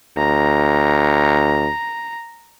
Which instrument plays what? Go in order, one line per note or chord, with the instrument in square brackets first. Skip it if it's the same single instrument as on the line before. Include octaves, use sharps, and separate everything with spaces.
[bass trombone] D2 [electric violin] A#5